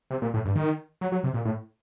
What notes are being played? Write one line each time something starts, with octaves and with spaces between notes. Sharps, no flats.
C3
A#2
A2
G2
D#3
F#3
F#3
C3
A#2
A2